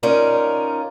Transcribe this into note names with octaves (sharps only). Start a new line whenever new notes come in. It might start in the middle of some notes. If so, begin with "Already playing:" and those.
C#4 D#4 F4 A#4 D5